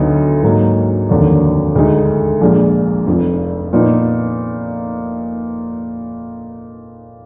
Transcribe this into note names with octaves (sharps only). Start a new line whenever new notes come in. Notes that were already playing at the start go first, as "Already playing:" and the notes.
Already playing: D2 D3 F#3 B3 D#4
G#2 F#3 A#3 D#4
F1 D#2 D3 F#3 D4
D2 D3 G#3 D#4
A#1 A#2 G#3
F1 F2 F3
A#2 F3 B3 D#4